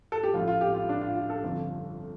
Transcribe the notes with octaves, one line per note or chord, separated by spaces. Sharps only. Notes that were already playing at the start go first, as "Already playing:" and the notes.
A4
G4
A1 A2 F3 F4
F4
G4
F4
D4
F4
F4
A4
G1 F2 F3